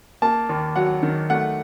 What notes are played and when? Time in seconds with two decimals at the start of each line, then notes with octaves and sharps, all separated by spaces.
0.22 A#3 A5
0.49 D#2
0.76 F#3 F#5
1.03 D#3
1.30 A3 F#5